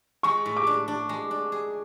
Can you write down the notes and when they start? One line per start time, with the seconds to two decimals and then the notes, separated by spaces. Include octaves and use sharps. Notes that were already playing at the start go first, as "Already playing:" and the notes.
0.23 G#3 C#6
0.46 A2
0.57 D6
0.67 D4
0.88 D4
1.09 G#3
1.31 D4
1.52 G#4